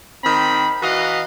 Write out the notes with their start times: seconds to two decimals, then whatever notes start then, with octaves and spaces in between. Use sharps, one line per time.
0.24 D#3 C4 B5
0.82 E3 F#4 D#5 F5 A#5